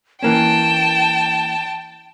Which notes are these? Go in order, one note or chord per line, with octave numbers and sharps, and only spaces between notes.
E3 A#3 C#4 G5 A5 E7